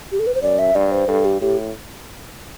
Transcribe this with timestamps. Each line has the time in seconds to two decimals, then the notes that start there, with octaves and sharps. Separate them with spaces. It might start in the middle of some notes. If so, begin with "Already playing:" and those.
0.12 G4
0.19 A4
0.27 B4
0.35 C5
0.42 F#2 D5
0.59 E5
0.75 G2 D5
0.92 C5
1.08 G2 A4
1.25 G4
1.41 A2 G4